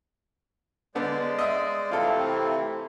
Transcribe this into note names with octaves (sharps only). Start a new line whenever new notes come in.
D3 G#3 B3 C5 D5
D#5 E5 D#6
C3 E3 A3 C4 E4 F4 A4